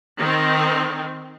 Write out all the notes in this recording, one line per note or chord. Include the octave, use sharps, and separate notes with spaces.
D#3 C4